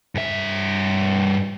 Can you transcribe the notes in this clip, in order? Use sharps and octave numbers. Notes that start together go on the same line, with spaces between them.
G2 E5